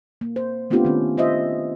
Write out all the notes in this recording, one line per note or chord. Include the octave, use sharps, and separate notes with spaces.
A#3
C5
A3 B3 C4 D4 F4 G4
D#3 C#4
F4 C5 D#5 E5